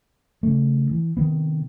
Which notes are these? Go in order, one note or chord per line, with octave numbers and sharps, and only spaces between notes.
C#3 A3
E3
C3 D#3 B3